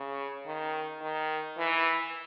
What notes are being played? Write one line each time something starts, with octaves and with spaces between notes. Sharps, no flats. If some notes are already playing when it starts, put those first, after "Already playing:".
Already playing: C#3
D#3
D#3
E3